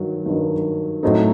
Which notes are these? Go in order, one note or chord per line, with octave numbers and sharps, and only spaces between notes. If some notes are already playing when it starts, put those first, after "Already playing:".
Already playing: G2 D#3 F#3
G2 D#3 F#3
A2 F#3 C4 D#4 A4